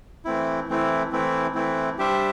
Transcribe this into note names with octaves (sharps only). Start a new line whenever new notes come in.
E3 A3 C4 E4
E3 A3 C4 E4
E3 A3 C4 E4
E3 A3 C4 E4
G3 D4 G4 C5 E5